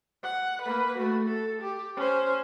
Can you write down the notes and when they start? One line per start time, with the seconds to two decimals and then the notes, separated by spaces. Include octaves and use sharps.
0.23 F#5
0.62 A#3 B4
0.97 A3 F#4
1.26 A4
1.62 G4
1.97 C#4 C5